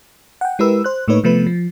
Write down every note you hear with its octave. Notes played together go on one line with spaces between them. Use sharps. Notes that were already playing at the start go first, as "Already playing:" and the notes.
F#5 G5
G#3 E4 G4 A#4 B4 E6
C5 F#6
A2 A3 A#3 D#4 B4 C#5
C3 F3 A3 B3 B4
F3